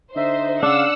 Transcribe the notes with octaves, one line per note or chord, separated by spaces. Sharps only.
D3 D#4 C5 D#5 E5
C#3 D4 F5 F#5 E6